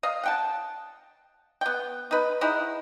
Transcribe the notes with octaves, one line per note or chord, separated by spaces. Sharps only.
D#5 F5
F#5 G5 A5
B3 G5
D#4 B4
D#4 E4 G#4 F#5